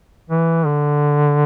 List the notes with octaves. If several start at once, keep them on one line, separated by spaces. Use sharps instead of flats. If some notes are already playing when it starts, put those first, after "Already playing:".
E3
D3